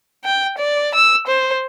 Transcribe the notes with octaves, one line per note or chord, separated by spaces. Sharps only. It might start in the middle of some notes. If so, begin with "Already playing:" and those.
G5
D5
E6
C5